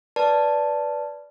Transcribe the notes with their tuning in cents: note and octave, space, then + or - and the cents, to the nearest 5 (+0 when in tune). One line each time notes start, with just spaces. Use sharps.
B4 -5 D5 -10 A5 +0